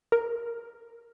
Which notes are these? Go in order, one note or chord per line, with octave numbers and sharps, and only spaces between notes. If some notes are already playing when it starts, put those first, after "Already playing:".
A#4